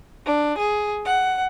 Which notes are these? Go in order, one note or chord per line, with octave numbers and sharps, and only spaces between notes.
D4
G#4
F#5